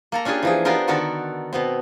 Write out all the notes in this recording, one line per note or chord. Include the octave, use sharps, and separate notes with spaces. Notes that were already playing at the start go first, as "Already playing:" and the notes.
A#3 A4 A#5
C#4 D4 F4 G4 G#4
E3 F3 G#4
B3 D4 F4 G4 A#4 C5
D3 D#3 B3 F#4 A4 A#4
B2 B3 C4